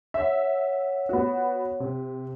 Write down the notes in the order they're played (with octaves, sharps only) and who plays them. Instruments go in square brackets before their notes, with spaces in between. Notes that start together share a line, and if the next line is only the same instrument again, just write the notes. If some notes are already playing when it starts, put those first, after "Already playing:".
[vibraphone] C#5 F#5 [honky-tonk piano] E5
[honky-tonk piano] B3 F#4
C3